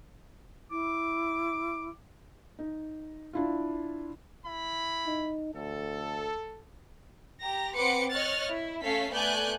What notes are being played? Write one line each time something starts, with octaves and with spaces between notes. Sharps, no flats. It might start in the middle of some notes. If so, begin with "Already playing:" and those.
E4 D6
D#4
D4 E4 F4
E4 B5
D#4
D2 A4
G4 A#5 A#6
C4 B4 F#5 C6 D6 C#7
C#5 D#5 F6 F#6 A6
E4
A3 C#4 A4 F5 B6 C7
A3 B3 D5 G#5 F#6 G6